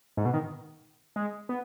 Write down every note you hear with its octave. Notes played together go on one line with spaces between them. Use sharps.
G#2
B2
D#3
G#3
B3